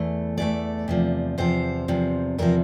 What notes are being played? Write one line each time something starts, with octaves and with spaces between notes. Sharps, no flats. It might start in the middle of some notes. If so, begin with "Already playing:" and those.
Already playing: E2 E3 A3
E2 E3 A3 D5
E2 C3 F3
E2 C3 F3 C5
E2 C3 F3
E2 C3 F3 A#4